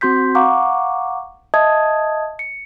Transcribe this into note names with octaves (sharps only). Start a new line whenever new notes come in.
C4 F#4 C6 G6 B6
F5 F#5 A#5 C#6 D6
D#5 E5 A5 D#6 G#6
C#7